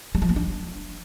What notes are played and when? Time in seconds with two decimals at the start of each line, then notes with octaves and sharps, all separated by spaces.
0.15 G3
0.22 F3
0.29 A#3
0.36 D4